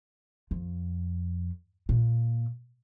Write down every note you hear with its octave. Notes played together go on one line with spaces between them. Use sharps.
F2
A#2